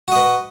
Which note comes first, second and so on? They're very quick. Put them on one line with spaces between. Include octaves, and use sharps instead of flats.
F#4 D#5 B4